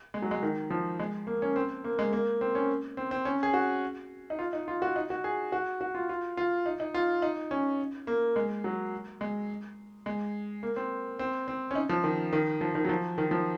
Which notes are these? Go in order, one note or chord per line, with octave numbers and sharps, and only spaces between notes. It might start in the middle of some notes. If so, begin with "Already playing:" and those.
G#3
F#3
G#3
D#3
F3
G#3
A#3
C#4
C4
A#3
G#3
A#3
C4
C#4
C4
C4
C#4
G#4
F#4
D#4
F4
D#4
F4
F#4
D#4
F#4
G#4
F#4
F#4
F4
F4
F4
D#4
D#4
F4
D#4
C#4
A#3
G#3
F#3
G#3
G#3
A#3
C4
C4
C4
C#4
D#4
F3
D#3
D#3
F3
D#3
F#3
F3
D#3
F3